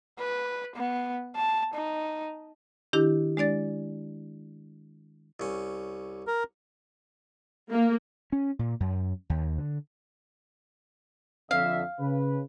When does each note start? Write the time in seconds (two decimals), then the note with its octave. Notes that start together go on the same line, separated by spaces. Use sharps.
0.19 B4
0.76 B3
1.35 A5
1.74 D#4
2.93 D#3 D4 E4 G4
3.37 G#3 D4 D5 A6
5.40 C2 C#4
6.27 A#4
7.71 A#3
8.32 C#4
8.59 A#2
8.80 F#2
9.30 D#2
9.58 D3
11.51 F2 D3 E5 F5
12.00 C#3 B4